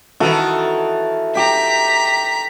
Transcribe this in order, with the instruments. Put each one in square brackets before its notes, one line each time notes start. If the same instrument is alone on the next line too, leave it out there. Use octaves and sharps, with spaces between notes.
[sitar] D#3 E3 E4 [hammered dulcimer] F#4 A4 F#5
[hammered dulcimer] G4 G5 [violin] A#5 B6